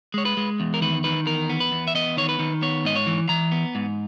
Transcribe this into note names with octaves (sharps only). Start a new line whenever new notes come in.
G#3 C#5
B4
G#3
E2
A#4
D#3 B4
D#3 B4
E2 A#4
B3
B4
E2
E5
B3 D#5
D#3 C#5
B4
D#3
B3 C#5
G#2 D#5
C#5
E3
E3 A#5
B3
G#2